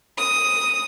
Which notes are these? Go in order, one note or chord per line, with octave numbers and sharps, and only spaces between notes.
D#6